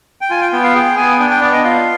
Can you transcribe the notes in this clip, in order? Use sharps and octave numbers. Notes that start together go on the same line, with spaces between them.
G5
F4 G#5
G5
B3 G5
F5
G#4 G5
B3 G#5
D4 G5
G5
B3 D5
D#5
F4 F5